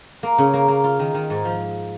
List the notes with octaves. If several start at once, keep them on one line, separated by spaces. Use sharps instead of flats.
A#3
C#3
A#3
A#3
F4
D#3
D#3
G#2
F3